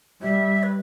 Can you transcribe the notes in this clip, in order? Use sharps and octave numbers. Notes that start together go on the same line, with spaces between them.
G3 E5
B4